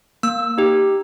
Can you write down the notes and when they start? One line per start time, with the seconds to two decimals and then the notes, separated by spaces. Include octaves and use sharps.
0.23 A#3 E6
0.58 D#4 G4